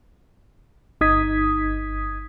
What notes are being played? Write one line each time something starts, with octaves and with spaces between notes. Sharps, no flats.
G1 D#4 D#6 G#6 B6